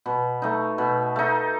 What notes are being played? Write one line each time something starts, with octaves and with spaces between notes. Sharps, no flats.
B2
A3 D#4
B2
A3 D#4